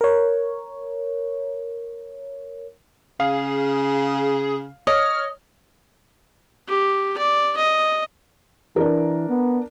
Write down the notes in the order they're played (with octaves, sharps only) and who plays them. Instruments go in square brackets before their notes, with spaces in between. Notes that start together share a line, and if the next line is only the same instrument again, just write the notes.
[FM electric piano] A#4 C#5
[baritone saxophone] C#3 [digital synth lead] G#4 [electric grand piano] F5
[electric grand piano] C#5 [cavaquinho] D#5 [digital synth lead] F6
[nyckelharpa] G4
D5
D#5
[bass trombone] E3 [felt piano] D4 A#4
[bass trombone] B3